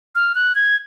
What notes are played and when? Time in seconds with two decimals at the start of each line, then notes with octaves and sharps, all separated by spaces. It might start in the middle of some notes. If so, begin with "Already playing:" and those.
0.15 F6
0.35 F#6
0.55 G#6